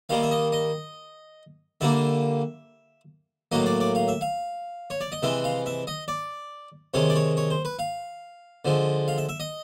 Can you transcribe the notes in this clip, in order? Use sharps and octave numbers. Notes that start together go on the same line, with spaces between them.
D#3 G3 A#3 F5
E5
D#5
D#5
D3 G3 A#3 E5
A2 F#3 A#3 D#5
D5
D5
F5
E5
F5
C#5
D5
D#5
C3 E3 G#3 E5
F5
E5
D#5
D5
C3 D#3 G#3 C#5
D5
C#5
C#5
C5
B4
F5
D3 F3 G#3
F5
E5
E5
D#5